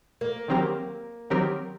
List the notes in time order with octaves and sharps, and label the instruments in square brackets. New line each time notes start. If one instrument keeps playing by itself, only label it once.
[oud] A#3
[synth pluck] D#3 F#3 C4 G4 A#4
D#3 F#3 C4 G4 A#4